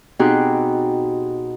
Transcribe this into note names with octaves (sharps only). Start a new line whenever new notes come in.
B2 C4 D#4 G4 G#4 F#6